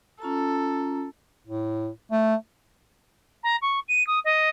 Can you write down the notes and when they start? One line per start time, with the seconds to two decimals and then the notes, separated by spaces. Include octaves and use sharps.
0.22 C#4 F4 A4 A#5
1.46 A2
2.12 A3
3.43 A#5
3.61 C#6
3.88 D#7
4.06 D#6
4.24 D#5